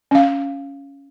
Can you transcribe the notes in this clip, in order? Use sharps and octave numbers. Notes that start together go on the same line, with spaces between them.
C#4 F5